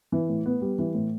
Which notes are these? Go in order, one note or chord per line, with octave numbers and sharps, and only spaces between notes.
E3
A2
B3
G3
E3
A2